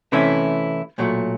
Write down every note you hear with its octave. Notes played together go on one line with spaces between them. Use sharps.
C3 E3 A3 C#4 E4
B1 A#2 F#3 A3